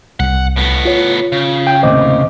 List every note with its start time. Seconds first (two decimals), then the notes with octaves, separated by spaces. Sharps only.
0.20 C2 F#5
0.56 A2 B3
0.85 F4 C#5
1.32 C#3
1.67 G5
1.83 D#2 A2 C3 C5 D#5 D6